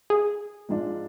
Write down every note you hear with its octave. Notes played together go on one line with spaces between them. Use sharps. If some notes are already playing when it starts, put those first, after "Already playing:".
G#4
G#2 F3 G#3 D4 F4